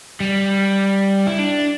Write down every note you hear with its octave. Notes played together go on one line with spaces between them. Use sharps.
G3
E4
D4